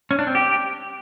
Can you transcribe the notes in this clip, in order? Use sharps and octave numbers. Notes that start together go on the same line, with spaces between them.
C#4
D4
C4
G4